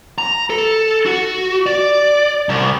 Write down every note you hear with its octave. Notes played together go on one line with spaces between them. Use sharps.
A#5
A4
F#4
D5
C2